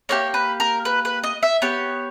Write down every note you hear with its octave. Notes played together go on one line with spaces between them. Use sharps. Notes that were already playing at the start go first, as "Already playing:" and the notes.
A#3 E4 G4 C#5
B4
A#4
B4
B4
D#5
E5
B3 G4 C#5